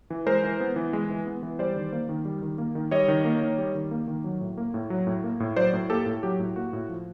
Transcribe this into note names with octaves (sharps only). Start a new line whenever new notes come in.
E3
G#3 A#4 C5
E3
B3
E3
G#3
E3
B3
E3
G3 C5 D5
D#3
A#3
D#3
G3
D#3
A#3
D#3
G3 C#5 D#5
D#3
A#3
D#3
G3
D#3
A#3
D#3
F#3
A2
A#3
A2
F#3
A2
A#3
A2
F#3 C5 D5
A2
A#3 G4 A4
A2
F#3 G4
A2
A#3 F#4
A2
F3